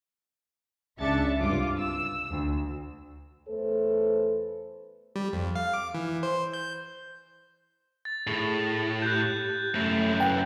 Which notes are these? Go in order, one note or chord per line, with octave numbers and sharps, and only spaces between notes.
C#2 C#3 D4 E5 A6 C#7
C2 G2 F4 D6
E6
D2
E2 A3 A4 B4 C5
G3
F2
F5
D6
E3
C5
G6
A6
A2 G#4
G4 F#6 G6
F#2 A3 E4
B4 F#5 G5